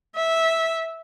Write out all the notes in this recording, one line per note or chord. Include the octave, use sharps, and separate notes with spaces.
E5